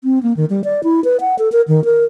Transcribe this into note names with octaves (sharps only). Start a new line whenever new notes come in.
C4
A#3
D#3
G3
D5
E4
B4
F#5
A4
A#4
D#3
A#4